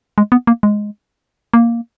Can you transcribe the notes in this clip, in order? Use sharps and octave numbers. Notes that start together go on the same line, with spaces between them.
G#3
B3
A#3
G#3
A#3